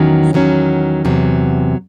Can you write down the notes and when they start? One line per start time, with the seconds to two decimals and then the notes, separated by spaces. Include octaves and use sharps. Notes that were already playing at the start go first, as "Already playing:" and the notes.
Already playing: E2 D#3 F#3 C#4
0.33 E2 D#3 F#3 C#4
1.05 E2 C3 F#3